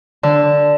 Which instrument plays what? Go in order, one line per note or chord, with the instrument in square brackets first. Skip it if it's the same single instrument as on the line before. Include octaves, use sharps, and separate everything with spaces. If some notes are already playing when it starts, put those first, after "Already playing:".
[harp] D3